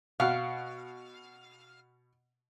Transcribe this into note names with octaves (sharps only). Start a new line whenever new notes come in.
B2 F5 F#5